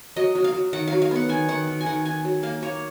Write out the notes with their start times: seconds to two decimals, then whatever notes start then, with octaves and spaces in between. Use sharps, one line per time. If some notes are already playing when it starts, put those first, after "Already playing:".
0.16 F#3 D#5
0.35 F#3
0.44 F5
0.53 F#3
0.73 D#3 F#5
0.87 F#3 F5
1.02 F5
1.11 B3 F#5
1.29 D#3 G#5
1.49 D#3 F#5
1.67 D#3
1.81 G#5
1.86 D#3 F#5
2.05 D#3 G#5
2.25 F#3
2.43 A#3 F5
2.62 A#3 C#5